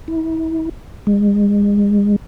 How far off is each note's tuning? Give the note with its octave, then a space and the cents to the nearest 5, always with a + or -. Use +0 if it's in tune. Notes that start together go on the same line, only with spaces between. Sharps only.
E4 -35
G#3 -30